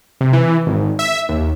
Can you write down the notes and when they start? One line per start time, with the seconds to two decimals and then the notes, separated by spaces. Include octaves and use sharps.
0.21 C3
0.33 E3
0.67 G#1
0.99 E5
1.29 D#2